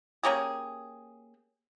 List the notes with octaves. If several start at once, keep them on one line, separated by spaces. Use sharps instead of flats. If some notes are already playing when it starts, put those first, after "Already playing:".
A#3 C#4 G4 G#4